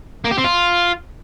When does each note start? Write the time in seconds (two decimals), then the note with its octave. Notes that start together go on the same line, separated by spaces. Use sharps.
0.24 A#3
0.31 G4
0.37 C4
0.44 F4